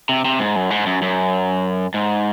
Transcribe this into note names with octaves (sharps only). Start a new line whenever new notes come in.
C3
C3
G#2
F#2
G#2
F#2
F#2
G#2